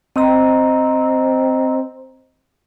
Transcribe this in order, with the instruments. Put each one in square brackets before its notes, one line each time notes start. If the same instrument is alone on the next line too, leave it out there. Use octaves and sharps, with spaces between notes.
[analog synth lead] C4 [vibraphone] D#5 A#5